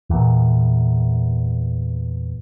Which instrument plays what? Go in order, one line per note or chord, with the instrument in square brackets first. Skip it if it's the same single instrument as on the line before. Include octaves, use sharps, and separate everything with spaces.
[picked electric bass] E2 A#2